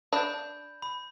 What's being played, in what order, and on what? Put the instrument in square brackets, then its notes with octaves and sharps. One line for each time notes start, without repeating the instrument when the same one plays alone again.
[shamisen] D4 [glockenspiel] B5 G6
[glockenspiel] B5